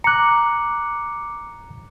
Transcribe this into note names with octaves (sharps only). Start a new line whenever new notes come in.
A#5 D6 F#6 C#7